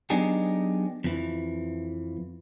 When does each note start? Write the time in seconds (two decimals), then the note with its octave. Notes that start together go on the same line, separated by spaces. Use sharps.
0.10 F#3 B3 D4 D#4 G4 G#4
1.04 F2 E3